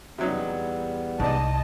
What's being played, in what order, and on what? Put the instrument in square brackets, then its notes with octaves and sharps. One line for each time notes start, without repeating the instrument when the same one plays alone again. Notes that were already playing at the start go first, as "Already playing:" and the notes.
[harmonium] E2 G3 B3 [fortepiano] C3 F#3 D#4
[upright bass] C2 [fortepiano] G#2 D5 [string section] D#5 A5